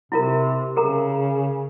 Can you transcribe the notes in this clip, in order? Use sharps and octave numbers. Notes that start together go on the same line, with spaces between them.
C3 E4 F4 A#4
C#3 G#4 A#4 A#5